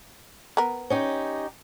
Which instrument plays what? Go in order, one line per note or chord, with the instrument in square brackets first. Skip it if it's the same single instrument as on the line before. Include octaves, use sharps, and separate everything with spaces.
[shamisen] B3 A#4
[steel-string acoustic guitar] C#4 D#4 G4